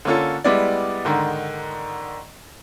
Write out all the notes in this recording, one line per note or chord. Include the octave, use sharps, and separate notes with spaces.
D3 A#3 C#4 F4 A4
G3 G#3 B3 E4 D5
G#2 D3 D#3